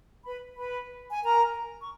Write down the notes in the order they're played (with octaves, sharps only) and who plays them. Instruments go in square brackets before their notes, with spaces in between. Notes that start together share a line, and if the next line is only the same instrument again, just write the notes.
[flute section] B4 B5
B4 B5
G#5
A#4 A#5
C#6